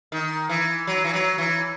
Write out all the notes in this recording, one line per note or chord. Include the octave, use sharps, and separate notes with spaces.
D#3
E3
F#3
E3
F#3
E3